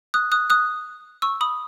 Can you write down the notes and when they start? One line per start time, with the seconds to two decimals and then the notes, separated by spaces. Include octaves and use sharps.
0.14 D#6 F#6
0.32 D#6 F#6
0.50 D#6 F#6
1.22 C#6 E6
1.41 B5 D#6